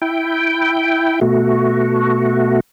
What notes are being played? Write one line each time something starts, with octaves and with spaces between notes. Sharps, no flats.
E4 G5
B2 A3 F#4